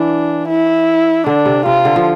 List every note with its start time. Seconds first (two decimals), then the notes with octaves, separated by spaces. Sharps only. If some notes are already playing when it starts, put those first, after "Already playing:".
Already playing: E3 D4
0.48 E4
1.26 D3 D4
1.46 C3
1.66 C3 F4
1.85 D3
1.96 F3